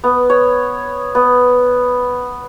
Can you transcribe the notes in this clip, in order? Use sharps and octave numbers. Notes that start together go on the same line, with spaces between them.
B3
C#5
B3